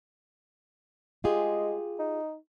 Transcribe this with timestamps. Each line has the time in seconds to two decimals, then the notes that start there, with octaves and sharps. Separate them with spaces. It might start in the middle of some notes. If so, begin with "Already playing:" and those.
1.24 G#3 F4 G4 G#4
1.99 D#4